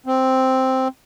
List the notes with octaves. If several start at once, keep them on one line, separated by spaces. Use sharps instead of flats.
C4